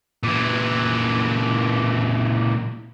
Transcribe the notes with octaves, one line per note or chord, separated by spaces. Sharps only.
A#2 E3